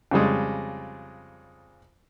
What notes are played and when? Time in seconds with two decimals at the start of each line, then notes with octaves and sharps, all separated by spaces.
0.11 F2 C#3 G3 G#3